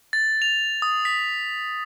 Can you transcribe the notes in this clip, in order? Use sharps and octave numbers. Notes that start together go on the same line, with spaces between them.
A6
F7
D#6
B6